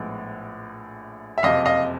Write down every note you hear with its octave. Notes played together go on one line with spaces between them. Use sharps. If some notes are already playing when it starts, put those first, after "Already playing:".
Already playing: A#1 A2 F3 G#3 B3
E5
F#1 F2 C3 D#5 F5
D#5 F5